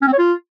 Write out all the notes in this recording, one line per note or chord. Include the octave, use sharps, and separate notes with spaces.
C#4
C4
C#5
F4